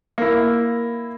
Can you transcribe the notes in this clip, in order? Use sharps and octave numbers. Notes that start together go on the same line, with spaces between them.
A#3 E4